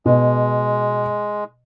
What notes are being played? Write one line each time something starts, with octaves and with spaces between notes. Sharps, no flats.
B2 G#3